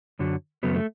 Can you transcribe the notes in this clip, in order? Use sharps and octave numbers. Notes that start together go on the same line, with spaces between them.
F#2 D3 F#3
F#2 C#3 F#3 A3 B3
A3